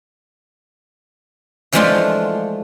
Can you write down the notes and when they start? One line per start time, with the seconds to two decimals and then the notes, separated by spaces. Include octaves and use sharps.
1.72 E3 F3 G#3 A3 D4 F4